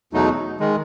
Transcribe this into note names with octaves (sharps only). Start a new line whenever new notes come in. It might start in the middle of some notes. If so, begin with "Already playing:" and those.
E2 B2 F#3 A3 D#4
D#3 G#3